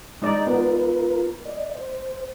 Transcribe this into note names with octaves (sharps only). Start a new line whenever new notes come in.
G#3 D#4 D5
B3 F4 A#4 B4
D5 D#5
C5